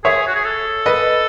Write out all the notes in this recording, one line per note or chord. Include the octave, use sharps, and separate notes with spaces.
G#4 C#5 E5
F#4
G#4
A4
B4 D#5